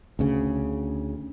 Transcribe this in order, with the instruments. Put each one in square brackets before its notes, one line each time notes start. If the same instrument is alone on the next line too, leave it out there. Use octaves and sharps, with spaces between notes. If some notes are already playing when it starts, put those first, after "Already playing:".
[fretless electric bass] D2 C#3